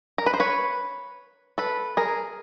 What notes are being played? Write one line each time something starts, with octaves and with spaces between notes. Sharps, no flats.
A#4
B4
C5
B4 C#5
A4 B4
G#4 A#4